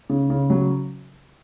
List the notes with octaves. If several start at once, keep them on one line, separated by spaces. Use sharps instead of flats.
C#3
C#3
F#3